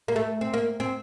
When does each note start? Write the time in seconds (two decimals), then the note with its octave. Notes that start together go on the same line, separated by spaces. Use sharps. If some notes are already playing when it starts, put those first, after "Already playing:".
0.08 A#3
0.16 A3
0.41 C4
0.54 A#3
0.80 C4